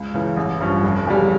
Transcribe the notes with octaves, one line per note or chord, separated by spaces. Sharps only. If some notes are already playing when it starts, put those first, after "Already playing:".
Already playing: C#2
C#3 E3
A1
G2 F3 C#4
F1
E2 C#3 G3